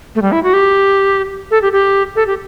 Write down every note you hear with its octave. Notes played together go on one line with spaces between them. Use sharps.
A3
G3
E4
F#4
G4
A4
G4
G4
A4
G4